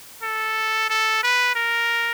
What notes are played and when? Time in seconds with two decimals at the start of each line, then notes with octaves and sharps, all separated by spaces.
0.22 A4
0.89 A4
1.23 B4
1.56 A#4